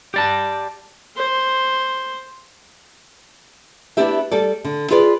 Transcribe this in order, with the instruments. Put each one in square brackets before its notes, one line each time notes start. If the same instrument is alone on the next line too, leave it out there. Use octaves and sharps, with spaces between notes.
[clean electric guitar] G4 D5 A5
[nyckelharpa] C5
[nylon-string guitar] B3 D4 E4 G4 E5
G3 A4 D5
D3
F4 G#4 B4 D5